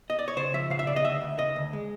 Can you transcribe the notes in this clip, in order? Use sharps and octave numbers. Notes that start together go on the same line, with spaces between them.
D#5
D5
C#5
C#3 C5
F3 E5
C#3 F5
E5
C#3 D5
D#5
D2 E5
D2
C#3 D#5
D2
G#3